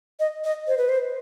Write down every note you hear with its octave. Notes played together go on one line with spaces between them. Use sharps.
D#5
D#5
C5
B4
C5